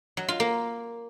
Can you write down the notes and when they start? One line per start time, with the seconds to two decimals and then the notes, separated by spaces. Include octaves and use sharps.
0.17 F#3
0.28 F4
0.40 A#3